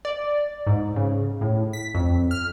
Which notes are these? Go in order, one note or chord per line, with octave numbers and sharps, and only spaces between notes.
D5
G#2
C#3
A2
B6
F2
F6